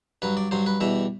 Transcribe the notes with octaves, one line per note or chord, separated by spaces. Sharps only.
G2 F#3 B4
D5
G2 F#3 C5
B4
E2 B2 G3 E5